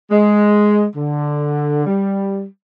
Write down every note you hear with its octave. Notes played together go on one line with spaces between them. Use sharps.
G#3
D3
G3